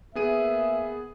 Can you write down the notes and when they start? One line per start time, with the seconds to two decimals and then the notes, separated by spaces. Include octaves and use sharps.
0.15 A#3 B3 G#4 E5 D#7